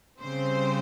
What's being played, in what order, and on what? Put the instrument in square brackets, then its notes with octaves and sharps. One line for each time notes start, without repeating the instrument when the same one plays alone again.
[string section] C#3 G3 C4 C5